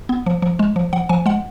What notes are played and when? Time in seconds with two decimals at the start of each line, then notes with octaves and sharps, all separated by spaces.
0.09 B3
0.26 F3
0.42 F3
0.59 G#3
0.76 F3
0.93 F3 F#5
1.09 F3 G#5
1.26 G#3 F#5